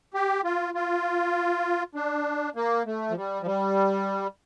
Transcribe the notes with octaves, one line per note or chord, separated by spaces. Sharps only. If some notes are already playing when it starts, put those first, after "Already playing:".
G4
F4
F4
D4
A#3
A3
F3
G3
F3
G3